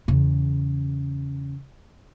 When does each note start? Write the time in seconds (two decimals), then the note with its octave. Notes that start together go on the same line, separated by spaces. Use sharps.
0.08 E2 C#3